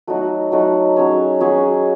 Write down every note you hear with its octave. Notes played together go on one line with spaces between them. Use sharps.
F#3 A3 D#4 F#4
F#3 A3 D#4 F#4
F#3 C#4 G#4 C#5
F#3 C#4 G#4 C#5